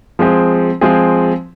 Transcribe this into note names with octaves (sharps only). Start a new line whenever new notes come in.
F3 G#3 C4 G#4
F3 G#3 C4 G#4